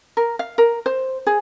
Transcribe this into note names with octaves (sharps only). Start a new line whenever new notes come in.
A#4
F5
A#4
C5
G#4